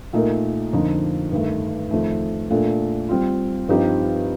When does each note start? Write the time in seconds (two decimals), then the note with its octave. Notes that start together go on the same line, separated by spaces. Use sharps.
0.13 A#2 A3 D#4 A#4
0.73 F2 D3 F3 A#3 D#4
1.32 G2 D#3 A3
1.91 F2 D#3 A3
2.50 A#2 A3 D4 A4
3.09 G3 C4 F4
3.68 G2 F3 C4 D#4 G4